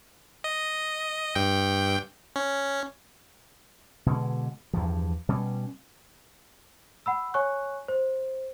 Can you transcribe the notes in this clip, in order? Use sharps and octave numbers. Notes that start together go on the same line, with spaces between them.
D#5
G2 G5
C#4
B2 D3 G#3
E2 G2 F3
B2 G3 C#4
F#5 B5 E6
C#5 G#5 C#6 F#6
C5